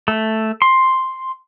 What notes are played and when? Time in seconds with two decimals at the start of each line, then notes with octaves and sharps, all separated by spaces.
0.08 A3
0.62 C6